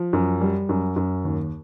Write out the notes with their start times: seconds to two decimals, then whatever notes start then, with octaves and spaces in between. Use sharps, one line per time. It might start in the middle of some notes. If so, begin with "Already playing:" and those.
Already playing: F3
0.13 F#2
0.41 G3
0.69 F#2
0.96 F#2
1.25 D#2